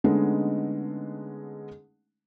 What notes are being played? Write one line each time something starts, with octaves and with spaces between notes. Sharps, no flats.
D3 G#3 A3 B3 C#4 D#4